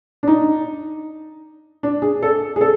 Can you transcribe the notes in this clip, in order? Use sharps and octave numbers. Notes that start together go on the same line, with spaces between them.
D4
D#4
D4
G#4
A4
G#4
A4